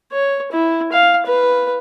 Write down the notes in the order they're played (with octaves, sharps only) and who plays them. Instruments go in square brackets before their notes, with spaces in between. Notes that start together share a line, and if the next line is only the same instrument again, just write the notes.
[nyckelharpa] C#5
E4
F5
B4